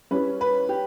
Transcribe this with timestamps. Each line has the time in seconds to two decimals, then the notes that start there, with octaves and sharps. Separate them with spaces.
0.11 G3 C#4 E4 B4
0.41 B4
0.69 G4